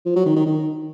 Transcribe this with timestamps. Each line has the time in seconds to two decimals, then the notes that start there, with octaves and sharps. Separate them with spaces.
0.06 F3
0.16 F#3
0.26 D#3
0.36 D#3
0.46 D#3